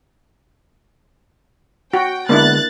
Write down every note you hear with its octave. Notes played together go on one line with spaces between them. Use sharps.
F#4 G5
D3 G#3 A#3 B3 D4 E4 F#6 A6